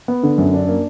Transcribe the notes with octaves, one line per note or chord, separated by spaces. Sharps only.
B3
D3
F#2
D4
A#3